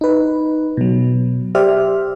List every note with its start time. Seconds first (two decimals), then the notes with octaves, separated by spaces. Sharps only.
0.01 D#4 B4
0.77 B2 F#3
1.55 G4 C5 D5 E5 F6